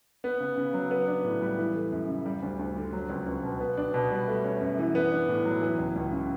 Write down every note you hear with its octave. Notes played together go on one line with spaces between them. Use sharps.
B3
C#3
C#3
F#3
B3
D4
A2
G3
E3
A3
F#2
C#3
G3
D2
D2
D3
F#3
C#2
C#2
B2
B3
D4
B2
G3
A3
C#4
F#2
E3
B3
D4
A2
F#3
E3
C#2
C#2
C#3